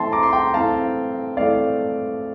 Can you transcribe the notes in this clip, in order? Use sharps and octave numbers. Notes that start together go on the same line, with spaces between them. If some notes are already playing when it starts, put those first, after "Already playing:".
Already playing: E3 A3 C4 E5 G5 A5 C6
A#5 D6
C6
G5 A#5
E3 A3 C4 F5 A5
E3 A3 C4 D5 F5